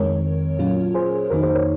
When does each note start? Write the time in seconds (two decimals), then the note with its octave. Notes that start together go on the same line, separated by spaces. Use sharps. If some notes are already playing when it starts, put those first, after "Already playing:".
Already playing: F2 D#3 G#3 C4 A#4 C#5
0.59 A#2 F#3 C#4 F4
0.94 G#4 C5
1.30 F2 D#3 A#3 D#4 F#4 A#4
1.43 G#4 C5
1.55 A#4 C#5